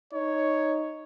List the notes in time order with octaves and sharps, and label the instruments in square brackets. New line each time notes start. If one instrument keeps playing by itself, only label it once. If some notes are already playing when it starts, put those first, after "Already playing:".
[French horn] D#4 [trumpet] C#5